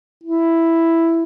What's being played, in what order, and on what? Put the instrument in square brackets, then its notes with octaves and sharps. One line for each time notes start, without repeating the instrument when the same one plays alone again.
[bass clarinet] E4